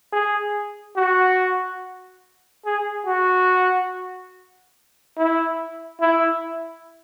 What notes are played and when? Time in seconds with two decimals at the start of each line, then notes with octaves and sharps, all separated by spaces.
0.13 G#4
0.96 F#4
2.65 G#4
3.06 F#4
5.17 E4
6.00 E4